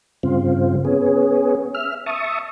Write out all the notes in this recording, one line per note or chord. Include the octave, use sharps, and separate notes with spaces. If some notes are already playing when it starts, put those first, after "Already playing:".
G2 C#3 C4 F4
B3 C#4 G#4
E5 F6
E5 A5 C#6 D#6